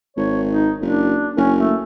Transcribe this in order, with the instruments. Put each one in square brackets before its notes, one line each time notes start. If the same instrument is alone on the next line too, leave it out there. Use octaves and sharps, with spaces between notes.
[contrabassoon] G#1 [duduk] C#5
[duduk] D#4
[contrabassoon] F#1 [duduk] D4
[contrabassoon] F#1 [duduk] C#4
[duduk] A3